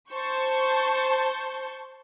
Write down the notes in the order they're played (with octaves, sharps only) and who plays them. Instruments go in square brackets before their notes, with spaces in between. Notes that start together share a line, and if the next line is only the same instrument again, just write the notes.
[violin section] C5 A5 C#6 G6